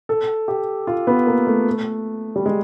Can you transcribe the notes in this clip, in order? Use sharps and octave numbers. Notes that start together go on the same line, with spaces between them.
A4
G4
F4
B3
A#3
A3
G3
G#3